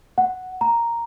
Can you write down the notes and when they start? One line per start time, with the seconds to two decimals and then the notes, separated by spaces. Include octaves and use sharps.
0.18 F#5
0.61 A#5